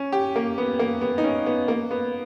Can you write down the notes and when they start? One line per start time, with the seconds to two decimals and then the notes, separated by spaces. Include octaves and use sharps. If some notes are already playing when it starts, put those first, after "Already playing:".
Already playing: C#4
0.12 G4
0.36 A#3
0.58 B3
0.79 A#3
1.01 B3
1.18 D#4
1.24 C#4
1.46 B3
1.68 A#3
1.91 B3